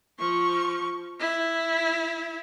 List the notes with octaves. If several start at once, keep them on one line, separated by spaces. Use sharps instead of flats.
F3 C#6
E4